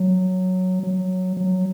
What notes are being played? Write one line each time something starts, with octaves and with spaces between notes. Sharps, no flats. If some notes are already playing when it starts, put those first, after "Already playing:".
Already playing: F#3
F#3
F#3